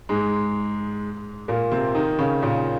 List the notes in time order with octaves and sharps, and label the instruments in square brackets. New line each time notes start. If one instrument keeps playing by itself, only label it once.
[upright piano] G#2 G#3
A#2 A#3
C3 C4
D#3 D#4
C#3 C#4
A#2 A#3